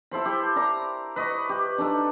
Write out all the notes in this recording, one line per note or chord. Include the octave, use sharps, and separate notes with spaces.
E4 A4 C5 B5
G4 A4
A#4 D5 A#5
B4 D#5 C#6
G4
D4 D#4 A4 B4